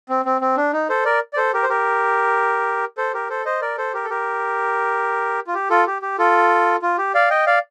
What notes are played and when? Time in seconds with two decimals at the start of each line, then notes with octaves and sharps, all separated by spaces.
0.09 C4
0.25 C4
0.41 C4
0.57 D4
0.73 D#4
0.89 A4 C5
1.05 A#4 D5
1.33 D5
1.37 A4 C5
1.54 G4 A#4
1.63 C5
1.69 G4 A#4
2.98 A4 C5
3.14 G4 A#4
3.30 A4 C5
3.46 C5 D#5
3.62 A#4 D5
3.78 A4 C5
3.93 G4 A#4
4.04 A4
4.10 G4 A#4
5.47 F4
5.54 G4
5.70 F4 A4
5.87 G4
6.02 G4
6.18 F4 A4
6.82 F4
6.98 G4
7.14 D5 F5
7.30 D#5 G5
7.47 D5 F5